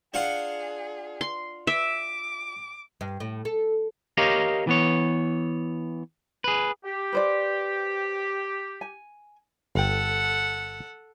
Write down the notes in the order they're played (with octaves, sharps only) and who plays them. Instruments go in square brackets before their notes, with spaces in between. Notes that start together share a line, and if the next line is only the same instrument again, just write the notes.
[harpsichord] D4 F4 F#5 [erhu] G#4
[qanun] C6
[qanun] E5 [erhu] D6
[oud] G2
A2
A4
[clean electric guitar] G4 A#4 C#5 D#5 F5
E3 B3 C#5
G#4 B4
[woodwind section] G4
[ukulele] B4 C5 D5
G#5
[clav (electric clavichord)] G1 G5 [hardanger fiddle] A4 F#5